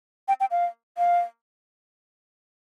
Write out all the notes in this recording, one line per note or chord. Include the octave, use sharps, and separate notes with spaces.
G5
G5
F5
F5